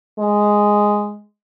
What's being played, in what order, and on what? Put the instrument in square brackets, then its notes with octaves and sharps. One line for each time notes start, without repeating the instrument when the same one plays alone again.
[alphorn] G#3